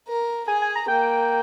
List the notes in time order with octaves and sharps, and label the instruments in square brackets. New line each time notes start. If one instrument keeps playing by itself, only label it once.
[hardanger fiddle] A#4
[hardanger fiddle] G#4 [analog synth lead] G#5
[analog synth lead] G#5
A#5
[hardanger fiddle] A#3 [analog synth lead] G5